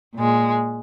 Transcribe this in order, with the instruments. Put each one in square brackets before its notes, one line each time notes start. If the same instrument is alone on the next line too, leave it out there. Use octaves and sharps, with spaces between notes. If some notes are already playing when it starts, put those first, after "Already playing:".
[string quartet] A#2 G#3